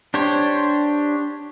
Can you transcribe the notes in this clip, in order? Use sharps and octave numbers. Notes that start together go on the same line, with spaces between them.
D4 G4 C5 C#5